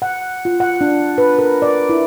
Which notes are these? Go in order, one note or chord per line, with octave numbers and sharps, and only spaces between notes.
F#5
F4
F#5
D4
B4
A#4
D5
E4